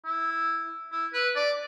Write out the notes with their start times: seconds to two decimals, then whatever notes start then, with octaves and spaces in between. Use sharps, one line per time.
0.05 E4
0.92 E4
1.13 B4
1.36 D5